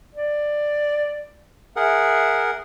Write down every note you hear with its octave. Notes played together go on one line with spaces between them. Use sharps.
D5
G#4 A#4 E5 F#5